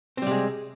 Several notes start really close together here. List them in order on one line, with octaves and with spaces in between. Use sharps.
C4 G3 C3 G#3